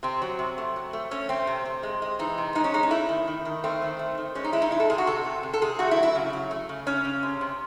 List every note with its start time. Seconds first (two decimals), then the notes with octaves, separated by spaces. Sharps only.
0.03 C3 C4
0.22 F#3
0.39 C3
0.58 A3
0.76 F#3
0.93 A3
1.11 A3 C#4
1.29 A3 C4
1.47 C3
1.65 C3
1.83 G#3
2.02 G#3
2.19 E3 D#4
2.38 C3
2.55 G#3 D#4
2.64 C#4
2.74 G#3 D#4
2.83 C#4
2.91 A3 E4
3.09 D#3
3.27 D#3
3.45 D#3
3.64 A3 C4
3.82 D#3
3.99 A3
4.18 D#3
4.35 G#3 C#4
4.44 D#4
4.53 G#3 E4
4.62 D#4
4.71 C3 E4
4.80 A4
4.90 C3 G#4
4.98 F#4
5.07 C3 A4
5.25 C3
5.43 C3
5.53 A4
5.61 C3 G#4
5.79 A3 F#4
5.91 E4
5.97 F#3
6.03 E4
6.15 C#3
6.33 F#3
6.51 A3
6.69 C#3
6.87 C#3 C#4
7.05 C#3
7.23 C3
7.41 C3